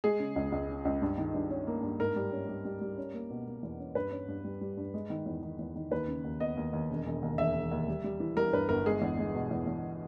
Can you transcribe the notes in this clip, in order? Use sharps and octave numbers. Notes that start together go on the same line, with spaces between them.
G#3 G#4
C#3
C#2
C#2
C#3
C#2
G2
D#3
G2
C#4
A#3
G2
G#2 A#4
G3
C#4
G3
G3
G3
C#4
A#3
B2
A#3
E2
C#4
G2 B4
C#4
G2
G3
G3
G2
G#3
D#3
E2
D#3
E2
D#3
D#2 B4
C#3
D#2
B3 D#5
D#2
D#2
E1
E1
D#2
E1 E5
E1
D#2
G3
G3
E3
G3 A#4
G2 B4
G1 A#4
G#3 G#4
E2
G#3
B2
E2
E2